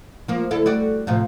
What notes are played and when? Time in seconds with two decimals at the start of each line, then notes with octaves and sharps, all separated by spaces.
0.28 F3 A#3
0.51 D2 E4 A4
0.66 G3 F#4 D5
1.07 A2 C3 F3